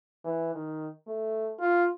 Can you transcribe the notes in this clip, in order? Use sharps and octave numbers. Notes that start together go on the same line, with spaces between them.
E3
D#3
A3
F4